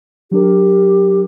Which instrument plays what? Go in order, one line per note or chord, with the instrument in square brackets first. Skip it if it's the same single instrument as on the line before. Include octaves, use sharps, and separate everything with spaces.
[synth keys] F#3 D4 A#4 [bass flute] G4